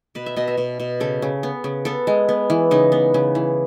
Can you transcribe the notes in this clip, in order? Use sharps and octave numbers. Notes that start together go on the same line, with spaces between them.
B2 B4
E5
B2 D#5
E5
B2
B2
C#3 A4
C#3
B3
C#3
B3 A4
G#3
B3
E3
C#3 D#4
B3
C#3
E3